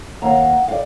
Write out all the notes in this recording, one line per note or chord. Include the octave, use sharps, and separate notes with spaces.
D#2 F5 F#5 A#5
D5 F5